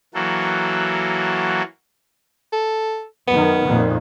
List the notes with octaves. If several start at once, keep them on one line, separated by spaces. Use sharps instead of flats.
E3 F#3 A#3 F#4 A4
A4
F#2 D#3 B3
F2 A#2 D#3